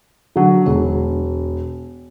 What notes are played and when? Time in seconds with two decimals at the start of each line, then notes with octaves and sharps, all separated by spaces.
0.36 D3 F#3
0.66 E1